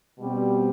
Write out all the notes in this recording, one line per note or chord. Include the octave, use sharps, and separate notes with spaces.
B2 G3 C4